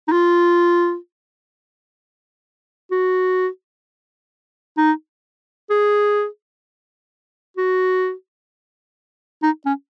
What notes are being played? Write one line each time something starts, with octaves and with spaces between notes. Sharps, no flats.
D#4
F4
F#4
D#4
G#4
F#4
D#4
C#4